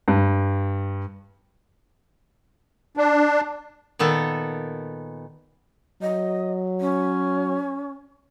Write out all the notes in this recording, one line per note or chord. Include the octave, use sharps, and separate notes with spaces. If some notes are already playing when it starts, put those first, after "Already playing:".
G2
D4
A#2 D#3 B3 A4
F#3 D#5
C#4